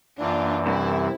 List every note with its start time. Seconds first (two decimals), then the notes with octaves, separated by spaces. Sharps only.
0.19 F#2 E3 A#3 D4 F4
0.66 C2 E4